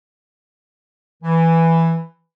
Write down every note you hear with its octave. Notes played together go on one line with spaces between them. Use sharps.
E3